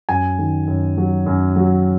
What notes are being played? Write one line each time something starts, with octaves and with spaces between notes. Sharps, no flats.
F#2 G#5
D#3
F#2
F#3
F#2
F#3